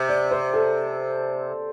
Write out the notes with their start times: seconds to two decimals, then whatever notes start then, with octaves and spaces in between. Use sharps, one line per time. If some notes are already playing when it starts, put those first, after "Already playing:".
Already playing: C3
0.09 D5
0.31 C5
0.54 A4